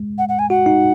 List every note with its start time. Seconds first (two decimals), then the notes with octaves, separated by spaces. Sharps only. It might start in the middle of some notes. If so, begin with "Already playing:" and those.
Already playing: G#3
0.18 F#5
0.29 F#5
0.39 G#5
0.50 F#4 F#5
0.66 D#4